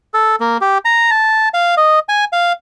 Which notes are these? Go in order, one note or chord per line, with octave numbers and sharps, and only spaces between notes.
A4
A#3
G4
A#5
A5
F5
D#5
G#5
F5